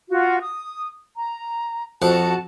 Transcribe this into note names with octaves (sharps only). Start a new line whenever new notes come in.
F4 F#4
D#6
A#5
F2 F3 F#4 F#5 A5